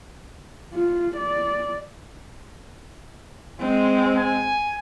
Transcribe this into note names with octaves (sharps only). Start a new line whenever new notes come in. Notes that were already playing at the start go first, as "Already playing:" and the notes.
F4
D5
G#3 C4
G#5